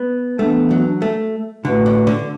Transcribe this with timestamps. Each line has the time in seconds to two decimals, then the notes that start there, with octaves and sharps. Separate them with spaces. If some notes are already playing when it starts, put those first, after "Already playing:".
Already playing: B3
0.39 E3 A3 B3 D4
0.71 F#3
1.02 A3
1.65 A2 D3 A3 F#4 B4
1.86 D3
2.07 D3